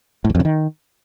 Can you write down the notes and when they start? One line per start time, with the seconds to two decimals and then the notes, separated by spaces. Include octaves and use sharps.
0.24 A2
0.30 E2
0.35 F2
0.40 C#3
0.45 D#3